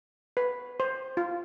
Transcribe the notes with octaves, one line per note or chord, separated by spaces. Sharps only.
B4
C5
F4